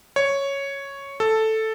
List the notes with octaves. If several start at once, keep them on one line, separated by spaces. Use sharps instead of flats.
C#5
A4